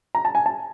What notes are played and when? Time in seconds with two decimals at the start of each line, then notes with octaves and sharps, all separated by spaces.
0.15 A#5
0.25 A5
0.35 G#5
0.46 A5